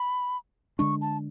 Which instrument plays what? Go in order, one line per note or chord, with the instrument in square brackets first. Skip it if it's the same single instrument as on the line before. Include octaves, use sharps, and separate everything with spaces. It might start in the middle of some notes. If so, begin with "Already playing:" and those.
Already playing: [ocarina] B5
[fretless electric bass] D3 G#3 D4 [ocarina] C#6
[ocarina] A5